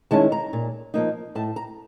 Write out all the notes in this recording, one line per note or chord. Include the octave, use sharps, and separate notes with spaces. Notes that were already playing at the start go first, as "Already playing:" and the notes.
D#3 G#3 C#4 E4 A5
A#5
A#2
F3 A#3 D#4
A2 A5
A#5